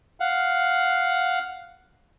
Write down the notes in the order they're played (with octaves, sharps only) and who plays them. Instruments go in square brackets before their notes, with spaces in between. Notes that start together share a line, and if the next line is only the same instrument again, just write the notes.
[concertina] F5 F#5